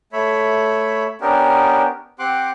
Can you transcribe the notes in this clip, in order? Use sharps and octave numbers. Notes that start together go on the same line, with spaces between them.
A3 C#5 E5 B5
B3 C#4 D4 G4 A#4
C4 G4 F#5 C6 D6 F#6